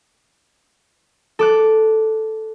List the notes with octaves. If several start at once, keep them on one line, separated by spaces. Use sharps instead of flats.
A4 D6 F#6